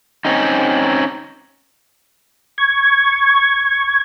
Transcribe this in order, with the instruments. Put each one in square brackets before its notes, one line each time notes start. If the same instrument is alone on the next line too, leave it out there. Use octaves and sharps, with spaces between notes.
[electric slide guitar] C4 C#4 D#4
[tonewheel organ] C#6 G#6